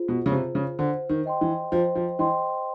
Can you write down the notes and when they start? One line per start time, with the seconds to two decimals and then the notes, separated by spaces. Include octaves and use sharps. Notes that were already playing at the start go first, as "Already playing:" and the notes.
Already playing: F4 G#4 C5
0.08 B2
0.26 C#3
0.32 C3 G#4 C5
0.55 C#3
0.79 D3 C5
1.09 D#3
1.26 D#5 G5 C6
1.41 E3
1.72 F3 C5
1.95 F3
2.19 E3 D#5 G5 C6